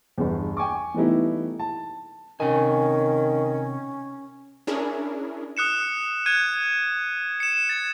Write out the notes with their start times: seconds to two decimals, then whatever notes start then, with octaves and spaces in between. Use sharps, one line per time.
0.18 G1 E2
0.57 G5 G#5 C#6 D6
0.94 E3 G3 A3 B3 D#4 E4
1.59 A5
2.40 C3 D#3 C#4 G#5
4.67 C#4 D4 E4 G#4 A#4
5.57 D#6 F#6 C#7 E7
6.26 F#6 G#6 D#7
7.40 C#7 E7
7.69 A6